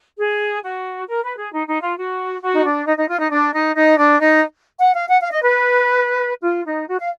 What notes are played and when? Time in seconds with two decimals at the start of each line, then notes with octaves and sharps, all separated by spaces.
0.18 G#4
0.63 F#4
1.08 A#4
1.23 B4
1.38 G#4
1.52 D#4
1.67 D#4
1.82 F4
1.97 F#4
2.42 F#4
2.54 D#4
2.64 D4
2.86 D#4
2.98 D#4
3.09 F4
3.20 D#4
3.31 D4
3.53 D#4
3.76 D#4
3.98 D4
4.20 D#4
4.80 F#5
4.95 F5
5.09 F#5
5.21 F5
5.32 D#5
5.43 B4
6.43 F4
6.66 D#4
6.88 F#4
6.99 F5